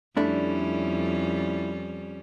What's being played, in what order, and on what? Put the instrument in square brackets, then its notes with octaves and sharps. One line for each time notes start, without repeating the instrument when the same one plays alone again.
[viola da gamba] F2 G3 C#4 [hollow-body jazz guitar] A3 D4 E4